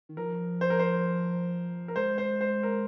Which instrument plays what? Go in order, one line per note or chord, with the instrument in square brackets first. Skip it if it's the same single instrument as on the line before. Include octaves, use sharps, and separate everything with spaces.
[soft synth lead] D#3
[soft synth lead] F3 [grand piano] A#4
[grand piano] C5
A#4
C5
A#4
[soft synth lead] G#3 [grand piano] C5
[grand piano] C5
C5
A#4